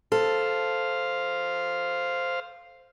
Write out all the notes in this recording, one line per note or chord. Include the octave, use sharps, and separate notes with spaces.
A4 C5 F5